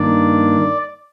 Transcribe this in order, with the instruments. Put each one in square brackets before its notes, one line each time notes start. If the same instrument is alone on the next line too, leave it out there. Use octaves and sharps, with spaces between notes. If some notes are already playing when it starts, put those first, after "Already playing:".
Already playing: [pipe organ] G2 D#3 A#3 D4 D5